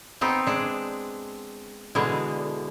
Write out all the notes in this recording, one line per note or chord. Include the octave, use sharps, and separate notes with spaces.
B3 C4 D#4
G#3 D4
B2 D3 E3 G#3